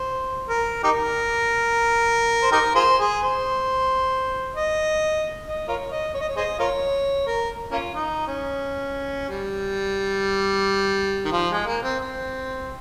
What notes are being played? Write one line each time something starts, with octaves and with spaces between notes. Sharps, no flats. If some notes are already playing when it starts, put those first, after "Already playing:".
Already playing: C5
A#4
D#4 G4 A#4
C5
D#4 G4 A#4
F4 G#4 C5
G#4
C5
D#5
D#5
F4 A#4 C#5
D#5
C#5
D#5
C#5
G#4 C5 D#5
F4 A#4 C#5
A#4
A#3 C#4 F4
D#4
C#4
G3
D#3
F3
G#3
A#3
C4
C4